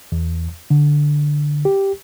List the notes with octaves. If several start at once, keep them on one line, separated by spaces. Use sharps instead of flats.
E2
D3
G4